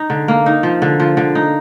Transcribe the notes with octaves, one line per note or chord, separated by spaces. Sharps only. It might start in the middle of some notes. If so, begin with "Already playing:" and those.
Already playing: D#4
D3
A#3
D#4
F3
D3
F3
D3
D#4